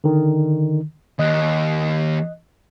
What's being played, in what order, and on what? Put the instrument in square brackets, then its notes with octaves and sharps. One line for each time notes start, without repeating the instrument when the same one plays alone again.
[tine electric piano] D3 D#3
[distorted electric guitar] D#2 [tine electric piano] D#5 F#6